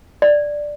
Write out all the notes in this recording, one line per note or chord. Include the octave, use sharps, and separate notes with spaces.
D5